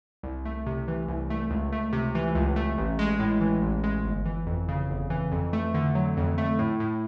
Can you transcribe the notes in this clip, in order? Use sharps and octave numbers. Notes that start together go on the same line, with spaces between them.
C2
A3
C3
E3
C2
A3
C#2
A3
C3
E3
C#2
A3
A1
G#3
A2
E3
A1
G#3
G1
E3
F2
C#3
G1
E3
F2
A3
D3
F#3
F2
A3
A2
A2